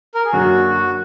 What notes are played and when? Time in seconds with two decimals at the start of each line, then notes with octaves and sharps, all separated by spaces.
0.15 A#4
0.25 G#4
0.33 F#2 D3 F#3 A#3 F#4